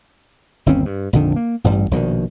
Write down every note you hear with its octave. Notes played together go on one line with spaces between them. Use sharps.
G1 D#2 C4 C#4
G2
A#1 F2 D3 D#3
A#3
A1 G2 G3
A#1 B2 D3 D#3